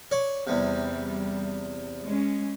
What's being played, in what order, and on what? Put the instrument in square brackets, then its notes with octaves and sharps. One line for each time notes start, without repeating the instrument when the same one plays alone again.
[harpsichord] C#5 D5
[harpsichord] E2 C3 [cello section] G3
[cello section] G#3 C#4